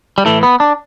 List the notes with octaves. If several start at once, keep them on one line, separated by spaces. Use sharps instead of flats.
G3
A2 E3 A3
B3
D4